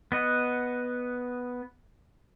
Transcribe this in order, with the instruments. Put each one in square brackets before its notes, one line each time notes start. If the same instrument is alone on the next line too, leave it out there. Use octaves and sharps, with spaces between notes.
[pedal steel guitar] B3 D#5 F#5